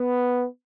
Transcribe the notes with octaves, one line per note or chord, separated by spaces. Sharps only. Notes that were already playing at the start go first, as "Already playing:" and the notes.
Already playing: B3